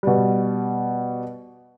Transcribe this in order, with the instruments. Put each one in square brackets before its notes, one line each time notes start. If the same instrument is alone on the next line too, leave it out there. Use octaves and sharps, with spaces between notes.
[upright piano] B2 G3